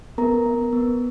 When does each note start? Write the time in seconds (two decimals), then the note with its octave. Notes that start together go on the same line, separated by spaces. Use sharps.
0.18 B3 A#4 A#5
0.46 B3
0.73 B3